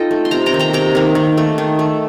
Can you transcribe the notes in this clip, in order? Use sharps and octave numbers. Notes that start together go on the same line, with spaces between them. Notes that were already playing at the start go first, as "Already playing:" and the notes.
Already playing: D#4 F4 A4 D#5 G5
A3
C6
C3 G5 A#5
G5 A#5
D#3 A#3
G5 A#5
C3 G5 A#5
D#3 A#3
D#3
A3
D#3
A3